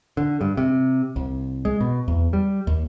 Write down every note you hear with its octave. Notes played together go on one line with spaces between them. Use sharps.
D3
G2
C3
C2
G#3
B2
E2
G3
D#2